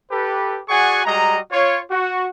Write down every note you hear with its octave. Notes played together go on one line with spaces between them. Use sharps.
G4 A4 B4
F#4 G#4 D5 F#5 G#5 C#6
G3 G#3 F#4 D#5 A#5
F4 C#5
F#4